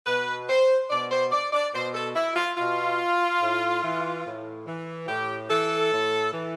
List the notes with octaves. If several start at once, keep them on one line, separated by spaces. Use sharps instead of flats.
B2 B4
C5
B2 D5
C5
D5
D5
B2 C5
A4
E4
F4
B2 F4
A2
E3
A2
E3
A2 G4
E3 A4
A2
E3